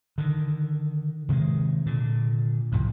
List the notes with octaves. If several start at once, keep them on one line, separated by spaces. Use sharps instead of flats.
D3 D#3
C3 D#3 F3 G#3
A#2 D3
C2 F2 A2